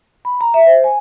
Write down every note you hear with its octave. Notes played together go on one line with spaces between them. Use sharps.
B5
A#5
E5
C5
G#5